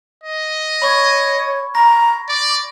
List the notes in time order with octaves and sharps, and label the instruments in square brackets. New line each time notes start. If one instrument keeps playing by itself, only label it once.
[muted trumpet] D#5
[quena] C#5 [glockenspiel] B5 C#6 G#6
[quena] A#5 [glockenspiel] A#6
[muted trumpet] D5 [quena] D6